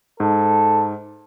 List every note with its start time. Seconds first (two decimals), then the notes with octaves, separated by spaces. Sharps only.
0.20 G#2 A4